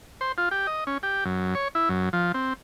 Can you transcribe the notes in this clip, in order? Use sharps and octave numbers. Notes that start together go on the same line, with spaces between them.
C5
F4
G4
D#5
C#4
G4
F#2
C#5
E4
F#2
F3
C4